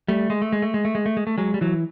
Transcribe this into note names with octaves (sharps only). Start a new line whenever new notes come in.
G3 A3
G#3
A3
G#3
A3
G#3
A3
G#3
A3
G#3
A3
F#3 G#3
G3
E3 F#3